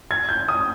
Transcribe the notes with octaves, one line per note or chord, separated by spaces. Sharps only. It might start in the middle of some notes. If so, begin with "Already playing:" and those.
G#6
G6
D#6